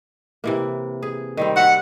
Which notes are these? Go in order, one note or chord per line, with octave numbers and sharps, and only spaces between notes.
C3 E3 A#3
G#4
D#3 G3 C4
E5 F#5